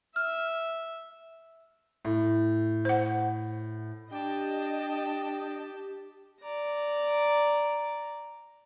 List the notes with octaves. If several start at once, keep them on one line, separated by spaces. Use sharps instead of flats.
E5 F6
A2
C5 F#5
D4 G4 D#5 G5 A5
D5 A#5